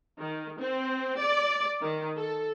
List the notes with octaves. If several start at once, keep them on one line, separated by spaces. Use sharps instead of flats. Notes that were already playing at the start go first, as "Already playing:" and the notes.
D#3
C4
D5
D#3
A4